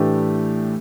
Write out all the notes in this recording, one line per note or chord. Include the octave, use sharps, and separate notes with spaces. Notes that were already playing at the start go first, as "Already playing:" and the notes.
Already playing: A2 E3 A3 D4 G4